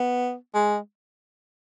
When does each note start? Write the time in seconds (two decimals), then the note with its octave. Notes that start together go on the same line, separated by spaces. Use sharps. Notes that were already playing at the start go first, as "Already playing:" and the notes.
Already playing: B3
0.54 G#3